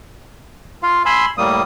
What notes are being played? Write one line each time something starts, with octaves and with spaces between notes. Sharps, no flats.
F4 F5
G#5 B5 C6 E6
A2 G3 A#3 D#6